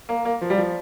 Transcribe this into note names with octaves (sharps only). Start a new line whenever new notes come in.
A#3
A#3
F3
G3
F3